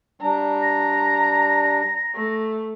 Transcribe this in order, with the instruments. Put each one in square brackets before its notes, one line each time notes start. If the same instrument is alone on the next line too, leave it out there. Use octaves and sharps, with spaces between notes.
[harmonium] G3 D4 [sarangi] A#5
[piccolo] A#6
[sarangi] A3